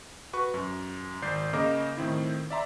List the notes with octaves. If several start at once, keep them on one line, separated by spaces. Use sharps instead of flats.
F#4 B4 C#6
F#2
G#1 D5 G6 C7
C#3 A#3 A#4 D#5 D6
A2 D#3 C4 E4
D5 E5 A#5 C6